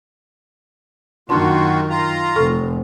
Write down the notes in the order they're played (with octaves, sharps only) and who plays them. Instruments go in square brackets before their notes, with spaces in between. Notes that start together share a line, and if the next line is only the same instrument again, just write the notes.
[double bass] F#2 D#3 [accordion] A#3 F4 F#4 [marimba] D4 A5 C6
[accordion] F4 A#5
[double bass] F1 [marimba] A4 C#6 F6